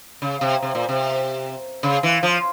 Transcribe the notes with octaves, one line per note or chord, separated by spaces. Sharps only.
C#3
C3
C3
A#2
C3
C#3
E3
F3